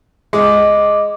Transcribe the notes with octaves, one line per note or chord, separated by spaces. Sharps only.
G#3 D#5 D6